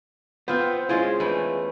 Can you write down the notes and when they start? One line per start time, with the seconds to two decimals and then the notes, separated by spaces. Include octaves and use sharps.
0.48 B3 C4 F4 C5 G5
0.89 G#3 C#4 E4 F4 G#4
1.20 E2 E3 A3